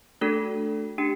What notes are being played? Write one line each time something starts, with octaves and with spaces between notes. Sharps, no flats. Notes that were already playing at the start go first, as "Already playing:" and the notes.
A3 D4 F#4 A4
D4 G4